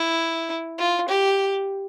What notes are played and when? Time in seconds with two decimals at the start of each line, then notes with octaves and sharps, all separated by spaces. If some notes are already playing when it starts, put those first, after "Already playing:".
Already playing: E4
0.78 F4
1.08 G4